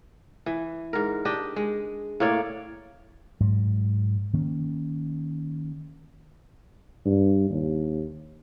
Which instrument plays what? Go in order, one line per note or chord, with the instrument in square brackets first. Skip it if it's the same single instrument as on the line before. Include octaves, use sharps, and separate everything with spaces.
[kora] E3
G#2 A#4
D4 G4 D#5
G#3
A2 A#3 C#5 D5
[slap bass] G#2 F#3
D#3 A#3 C#4
[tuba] G2
D#2